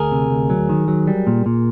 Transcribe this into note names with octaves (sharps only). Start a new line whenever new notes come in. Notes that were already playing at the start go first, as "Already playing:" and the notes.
Already playing: D2 G#4 A#4
C3
D2
F#3
D#3
F#3
G3
A#2
A#2